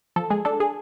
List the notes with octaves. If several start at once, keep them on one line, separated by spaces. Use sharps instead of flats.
F3 A4
G#3 G#4
D4 A4
G#4